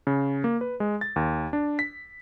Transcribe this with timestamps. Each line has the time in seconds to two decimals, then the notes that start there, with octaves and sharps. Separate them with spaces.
0.07 C#3
0.44 A#3
0.61 B4
0.80 G#3
1.01 A6
1.16 D#2
1.53 D4
1.79 B6